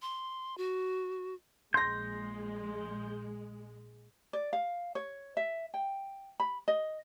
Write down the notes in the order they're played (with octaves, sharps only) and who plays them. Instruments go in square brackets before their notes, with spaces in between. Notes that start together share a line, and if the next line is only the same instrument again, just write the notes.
[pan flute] C6
F#4
[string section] A#1 G#3 [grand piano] C6 A#6 [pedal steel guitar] G6
[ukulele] D5
F5
C#5
E5
G5
B5
D#5